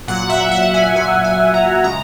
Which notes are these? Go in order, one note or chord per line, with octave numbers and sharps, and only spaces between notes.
A#2 F#3 F#5
E5
F#5
G#5
A#2 F#3 G#5
G#5
A#5
C#3 G#3 A#5